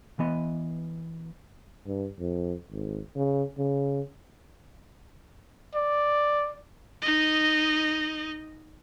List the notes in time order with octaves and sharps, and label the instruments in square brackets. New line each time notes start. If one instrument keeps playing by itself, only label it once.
[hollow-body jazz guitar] E3 B3 D#5
[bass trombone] G2
F2
G#1
C#3
C#3
[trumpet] D5
[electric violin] D#4 D#5